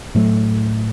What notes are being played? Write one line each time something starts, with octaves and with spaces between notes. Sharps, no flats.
A2 F#3 A3